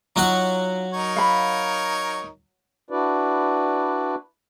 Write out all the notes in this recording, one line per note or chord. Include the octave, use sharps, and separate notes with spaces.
F#3 D#4 F4 F#4 D#5 F#5
D#4 A#4 C#5
F5 B5
D4 E4 F#4 B4 D5